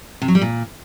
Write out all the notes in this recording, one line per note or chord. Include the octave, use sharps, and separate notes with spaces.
C3
F#3
G3
A#2